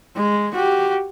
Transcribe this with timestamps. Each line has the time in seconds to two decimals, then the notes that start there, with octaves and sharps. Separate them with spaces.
0.16 G#3
0.54 F#4 G4